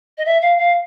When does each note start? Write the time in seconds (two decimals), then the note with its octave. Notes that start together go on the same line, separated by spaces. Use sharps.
0.18 D#5
0.25 E5
0.41 F5
0.58 F5